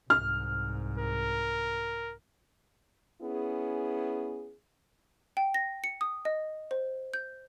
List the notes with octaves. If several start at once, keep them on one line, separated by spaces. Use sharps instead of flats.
C2 G#2 F6
A#4
B3 C#4 E4 G#4
G5
A#6
C#7
D#6
D#5
C5
G6